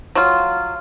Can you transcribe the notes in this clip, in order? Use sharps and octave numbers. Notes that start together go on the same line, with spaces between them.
F#3 F4